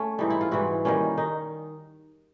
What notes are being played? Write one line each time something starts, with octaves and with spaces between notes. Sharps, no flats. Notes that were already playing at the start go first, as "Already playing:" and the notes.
Already playing: A3 C#4
G#2 E3 G3 D#4
E4
F4
G#2 E3 G3 E4 F#4
D#3 G3 A#3 C#4
D#3 D#4